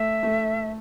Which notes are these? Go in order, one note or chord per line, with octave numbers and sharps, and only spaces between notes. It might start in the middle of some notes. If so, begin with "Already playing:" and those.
Already playing: A3 E5
A3